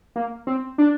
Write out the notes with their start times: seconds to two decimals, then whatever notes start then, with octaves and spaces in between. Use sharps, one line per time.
0.16 A#3
0.47 C4
0.78 D4